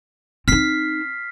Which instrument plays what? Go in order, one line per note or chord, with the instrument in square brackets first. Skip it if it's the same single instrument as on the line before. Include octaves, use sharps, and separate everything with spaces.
[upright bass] C4 D#4 [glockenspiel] F6 B6 C7